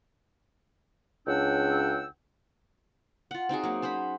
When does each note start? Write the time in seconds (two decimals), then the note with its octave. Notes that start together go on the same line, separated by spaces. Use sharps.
1.27 C#2 C#3 D4 F#5 G5 E6
3.31 F4 F#5
3.49 C4 D#4 F#4 G#4
3.64 F#3 A#3
3.82 C#4 C5 F#5 B5